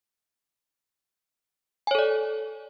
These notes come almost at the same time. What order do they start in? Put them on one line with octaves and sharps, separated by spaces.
G#5 C#5 A4 D5